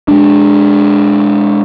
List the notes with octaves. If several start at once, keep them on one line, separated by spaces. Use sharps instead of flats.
G#3 D4